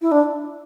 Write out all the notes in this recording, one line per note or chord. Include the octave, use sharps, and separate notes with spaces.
E4
D4